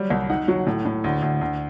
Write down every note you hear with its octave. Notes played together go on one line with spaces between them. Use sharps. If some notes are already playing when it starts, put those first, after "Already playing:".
Already playing: F#3 G3
C2
D#4 F#5
F#3
A2
A2
D2
D2
D2